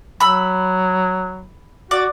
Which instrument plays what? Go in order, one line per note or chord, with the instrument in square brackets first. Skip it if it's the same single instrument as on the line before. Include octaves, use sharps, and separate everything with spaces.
[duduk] F#3 [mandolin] B5 E6
[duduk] F#4 [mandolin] D5